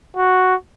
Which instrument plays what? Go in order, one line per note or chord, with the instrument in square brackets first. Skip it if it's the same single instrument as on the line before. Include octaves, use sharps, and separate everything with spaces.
[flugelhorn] F#4